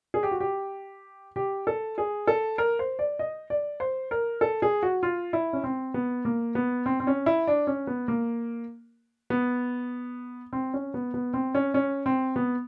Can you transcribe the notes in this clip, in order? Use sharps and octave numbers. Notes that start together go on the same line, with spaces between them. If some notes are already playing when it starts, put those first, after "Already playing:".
G#4
G4
F#4
G4
G4
A4
G#4
A4
A#4
C5
D5
D#5
D5
C5
A#4
A4
G#4
F#4
F4
E4
C#4
C4
B3
A#3
B3
C4
C4
C#4
E4
D4
C#4
B3
A#3
B3
C4
C#4
B3
B3
C4
C#4
C#4
C4
B3